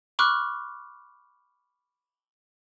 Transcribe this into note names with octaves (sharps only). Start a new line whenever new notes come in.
B5 C#6 D6 F6 F#6